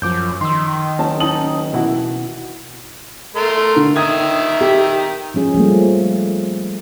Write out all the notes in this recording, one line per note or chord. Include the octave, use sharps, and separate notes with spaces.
F#2 F3 D6 G6
D#3 C6 E6
F#1 C#4 A5
C#4 D#4 A5 D#6 F#7
B2 E3 E4 F#4 F#5
A3 A#4 C6
D3
D#3 E5 D#6 G#6
G4
F3 G#3 C#4 G#4
F3 G3 A3 A#3